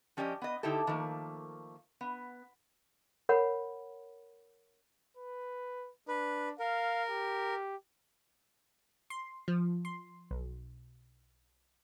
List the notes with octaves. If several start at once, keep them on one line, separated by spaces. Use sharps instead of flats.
F3 C#4 G4 D5 D#5
B3 D#5
D3 D#4 E4 G4 A4
D#3 F3 A3 A#3
B3
A#4 C#5 F#5 B5
B4
D4 B4
A#4 F5
G4
C6
F3
C6
B1